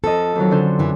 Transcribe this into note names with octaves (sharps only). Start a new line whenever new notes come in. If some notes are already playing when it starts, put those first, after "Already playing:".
F2 F3 A4 D#5
F2 D#3 F#3
D3 C#4 C5
F#2 E3